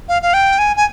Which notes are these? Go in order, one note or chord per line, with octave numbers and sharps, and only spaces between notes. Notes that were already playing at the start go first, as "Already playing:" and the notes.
F5
F5
G5
G#5
G#5